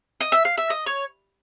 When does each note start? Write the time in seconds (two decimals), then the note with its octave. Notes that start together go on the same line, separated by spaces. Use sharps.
0.21 D#5
0.32 E5
0.45 F5
0.58 E5
0.70 D#5
0.86 C#5